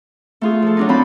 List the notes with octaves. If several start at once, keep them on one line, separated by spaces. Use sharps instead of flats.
A3 F4 G#4
F3 A4
F#3 D4 D#4
A#2 C4 F4 F#4 A5 B5